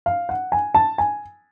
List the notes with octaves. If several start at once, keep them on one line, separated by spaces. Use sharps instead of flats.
F5
F#5
G#5
A5
G#5